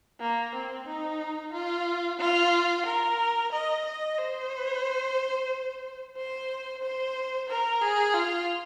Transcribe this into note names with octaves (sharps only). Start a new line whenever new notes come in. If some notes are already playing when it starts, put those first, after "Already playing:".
A#3
C4
D#4
F4
F4
A#4
D#5
D#5
C5
C5
C5
A#4
G#4
F4